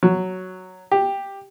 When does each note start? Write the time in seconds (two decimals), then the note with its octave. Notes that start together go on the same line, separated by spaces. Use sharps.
0.03 F#3
0.92 G4